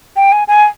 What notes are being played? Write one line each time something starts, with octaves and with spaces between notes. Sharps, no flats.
G5
G#5
G#5